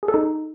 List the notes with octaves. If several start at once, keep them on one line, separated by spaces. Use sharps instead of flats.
G#4
A4
D#4